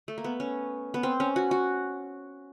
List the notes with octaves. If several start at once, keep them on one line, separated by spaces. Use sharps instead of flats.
A3
A#3
B3
C#4
B3
C4
C#4
F#4
F#4